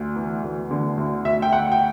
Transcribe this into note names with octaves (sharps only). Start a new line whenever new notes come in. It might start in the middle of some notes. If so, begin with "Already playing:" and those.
Already playing: D2
E3
D2
D3
D2
D2 E5
G5
D2 F#5
G5